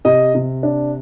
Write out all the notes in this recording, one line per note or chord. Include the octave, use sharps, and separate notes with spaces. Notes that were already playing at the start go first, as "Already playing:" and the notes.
C3 D#5
C3
D4